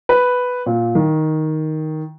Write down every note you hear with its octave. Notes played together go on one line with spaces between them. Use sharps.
B4
A#2
D#3